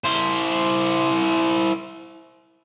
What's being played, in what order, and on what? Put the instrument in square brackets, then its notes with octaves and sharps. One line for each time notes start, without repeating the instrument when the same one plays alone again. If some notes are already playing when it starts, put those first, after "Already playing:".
[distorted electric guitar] E4 C5